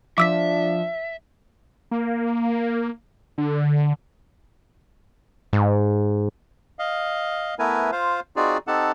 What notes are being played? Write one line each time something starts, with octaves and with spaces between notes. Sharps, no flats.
F3 D4 E5 D6 E6 B6
A#3
D3
G#2
D#5 F5
A3 B3 E4 A#4 B4 G#5
F4 C5 F5
C4 D#4 F4 F#4 G#4 D5
C4 D#4 G4 A4 F#5 A5